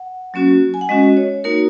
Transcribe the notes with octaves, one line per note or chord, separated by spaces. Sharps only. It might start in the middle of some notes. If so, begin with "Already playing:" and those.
Already playing: F#5
F#3 A#3 C#4 F#4
G#5
F#5
G#3 C#4 F#4 D#5
C#5
A#3 D#4 F#4 A#4